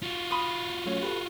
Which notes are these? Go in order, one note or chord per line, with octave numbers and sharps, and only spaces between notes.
F4 F#4
B5 C6 D#6
F#3 A3 C#4
G4 A4 B4